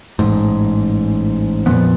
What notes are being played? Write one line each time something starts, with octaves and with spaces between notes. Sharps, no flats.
A1 G#2
F2 A#2 F3 B3